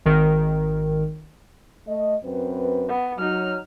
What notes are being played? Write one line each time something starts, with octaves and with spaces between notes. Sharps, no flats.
G#1 D#3 A#4
A3 D#5
F#2 C4 B4
B3
F#3 D#4 F6